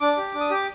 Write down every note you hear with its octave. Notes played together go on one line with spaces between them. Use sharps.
D4 D6
G4
D4
D#6
G4 D6